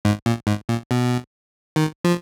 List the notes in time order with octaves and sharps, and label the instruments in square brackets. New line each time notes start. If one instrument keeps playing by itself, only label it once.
[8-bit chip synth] G#2
A#2
G#2
A#2
B2
D#3
F3